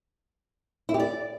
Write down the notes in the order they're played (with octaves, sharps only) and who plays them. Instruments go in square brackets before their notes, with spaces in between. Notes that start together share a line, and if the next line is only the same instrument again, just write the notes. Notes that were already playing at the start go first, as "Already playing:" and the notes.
[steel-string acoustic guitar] E4
G4
D5